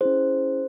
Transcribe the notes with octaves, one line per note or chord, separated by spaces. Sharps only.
C#4 E4 G#4 C5